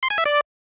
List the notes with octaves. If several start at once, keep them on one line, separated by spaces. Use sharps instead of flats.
C6
G#5
E5
D5